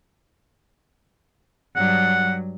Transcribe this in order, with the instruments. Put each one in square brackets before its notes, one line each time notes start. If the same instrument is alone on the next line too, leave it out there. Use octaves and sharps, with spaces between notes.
[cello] G2 F#3 [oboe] F#5